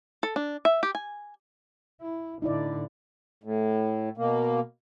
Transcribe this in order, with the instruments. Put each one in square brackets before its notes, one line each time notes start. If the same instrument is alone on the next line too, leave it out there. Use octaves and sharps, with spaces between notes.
[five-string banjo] A4
D4
E5
G4
G#5
[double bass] E4
[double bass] A2 D3 [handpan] D#4 E4 D5
[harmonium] A2
B2 A#3